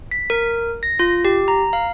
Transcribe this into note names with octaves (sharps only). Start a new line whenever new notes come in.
B6
A#4
A#6
F4
G4
A#5
F5